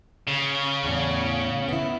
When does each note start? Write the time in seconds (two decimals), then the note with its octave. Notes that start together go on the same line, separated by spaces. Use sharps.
0.27 C#3
0.83 E2 A2
1.69 B3 E4